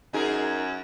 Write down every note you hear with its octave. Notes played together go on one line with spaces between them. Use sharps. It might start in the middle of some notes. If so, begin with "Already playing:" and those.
F#2 D#4 G#4 A#4